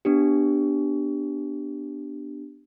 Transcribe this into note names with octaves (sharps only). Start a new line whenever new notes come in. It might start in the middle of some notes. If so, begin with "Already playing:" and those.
B3 D4 G4